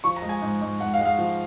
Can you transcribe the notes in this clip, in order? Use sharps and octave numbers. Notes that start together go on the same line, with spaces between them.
F3 C#6
A#5
G#3
G#5
G#2
G#2
G#2 F#5
F5
G#3
F5
F3